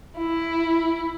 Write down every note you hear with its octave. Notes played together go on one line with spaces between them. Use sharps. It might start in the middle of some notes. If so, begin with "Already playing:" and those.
E4